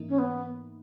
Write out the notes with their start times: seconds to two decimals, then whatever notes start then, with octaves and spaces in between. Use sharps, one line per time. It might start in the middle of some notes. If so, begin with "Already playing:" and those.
Already playing: G#2 E3 A#3 D#4
0.09 C#4
0.19 B3